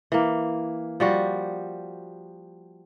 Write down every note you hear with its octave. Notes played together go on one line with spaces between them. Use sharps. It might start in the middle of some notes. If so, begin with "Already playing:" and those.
E3 A#3
F3 G3 F#4